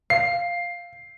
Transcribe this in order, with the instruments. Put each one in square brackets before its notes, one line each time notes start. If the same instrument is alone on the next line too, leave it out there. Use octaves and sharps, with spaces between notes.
[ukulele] F5 [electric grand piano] C7